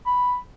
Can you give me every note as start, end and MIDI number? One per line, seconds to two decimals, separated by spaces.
0.06 0.37 83